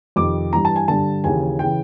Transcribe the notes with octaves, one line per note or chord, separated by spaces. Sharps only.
F2 C3 D#3 D6
G2 E3 A#5
A5
G#5
G2 D3 A5
D#2 C#3 E3 G#5
C#3 E3 G5